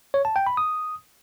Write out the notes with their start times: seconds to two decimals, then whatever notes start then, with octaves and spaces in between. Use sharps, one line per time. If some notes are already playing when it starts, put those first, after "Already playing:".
0.14 C#5
0.25 A5
0.36 G5
0.47 B5
0.57 D#6